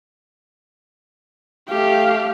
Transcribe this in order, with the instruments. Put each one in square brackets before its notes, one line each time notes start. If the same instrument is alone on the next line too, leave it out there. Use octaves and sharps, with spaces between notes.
[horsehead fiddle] A3 F5 [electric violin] G4